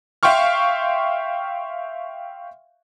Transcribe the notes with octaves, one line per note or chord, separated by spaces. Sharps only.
E5 F5 G5 C6 C#6 F6